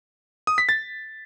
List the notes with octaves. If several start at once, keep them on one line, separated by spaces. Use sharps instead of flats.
D#6
B6
A6